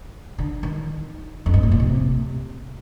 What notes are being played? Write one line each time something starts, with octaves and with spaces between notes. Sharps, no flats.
D3
D#3
F2
G2
A2
A#2
C3